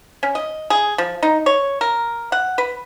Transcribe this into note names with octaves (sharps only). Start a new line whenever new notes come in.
C#4
D#5
G#4
F3
D#4
C#5
A#4
F#5
B4